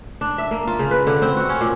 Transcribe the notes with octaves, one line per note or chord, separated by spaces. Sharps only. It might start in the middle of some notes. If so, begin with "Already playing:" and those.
D4
E5
A#3
F4
C#3
B4
D3
C4
F#4
C#4
A#2